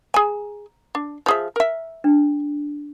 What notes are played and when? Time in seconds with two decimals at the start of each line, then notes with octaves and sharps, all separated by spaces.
0.14 G#4 G#5 A#5
0.95 D4
1.26 F3 G#4 E5
1.56 A#4 E5
2.04 D4